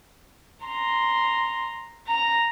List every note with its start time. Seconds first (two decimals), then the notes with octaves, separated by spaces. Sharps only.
0.65 A#5 C6
2.07 A#5